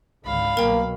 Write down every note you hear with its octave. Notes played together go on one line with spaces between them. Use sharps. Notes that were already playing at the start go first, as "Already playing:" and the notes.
G#1 C#2 D3 F5 B5
C2 B2 F#3 A#3 A#4 G5